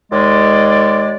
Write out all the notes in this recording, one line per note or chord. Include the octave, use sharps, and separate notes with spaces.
D#2 G#3 D5